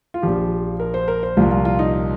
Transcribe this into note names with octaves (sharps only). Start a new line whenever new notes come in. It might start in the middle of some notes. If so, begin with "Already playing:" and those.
F4
A#1 A#2 F3 G4
A#4
C5
A#4
C5
C2 A#2 F3 A#3 F4
F4
F4
D#4